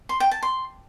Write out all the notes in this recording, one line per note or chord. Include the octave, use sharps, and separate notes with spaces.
C6
G5
A5
C6